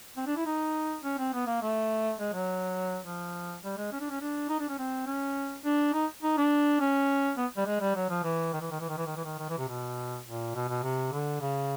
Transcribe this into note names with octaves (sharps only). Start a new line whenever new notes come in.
C4
D4
E4
D#4
C#4
C4
B3
A#3
A3
G#3
F#3
F3
G3
G#3
C#4
D4
C#4
D4
D#4
D4
C#4
C4
C#4
D4
D#4
D#4
D4
C#4
B3
G3
G#3
G3
F#3
F3
E3
D#3
E3
D#3
E3
D#3
E3
D#3
E3
D#3
D#3
E3
C3
B2
A#2
B2
B2
C3
D3
C#3